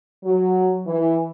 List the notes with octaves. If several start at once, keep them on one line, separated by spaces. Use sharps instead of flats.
F#3
E3